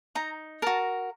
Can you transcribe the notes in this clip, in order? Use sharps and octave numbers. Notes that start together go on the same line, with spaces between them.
D#4 A#5
F#4 A#4 A5